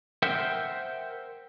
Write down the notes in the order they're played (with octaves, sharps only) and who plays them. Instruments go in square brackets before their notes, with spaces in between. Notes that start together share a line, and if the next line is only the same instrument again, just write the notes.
[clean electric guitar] A#4 C5 E5 F#5 G5